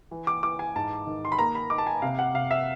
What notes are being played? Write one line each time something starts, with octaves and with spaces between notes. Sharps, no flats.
E3
D6
E3 D6
G#5
G#2 A5
D#3
C6
B5
A#3 A#5
B5
D#4 D6
A5
G#5
C3 F5
F#5
C3 F5
E5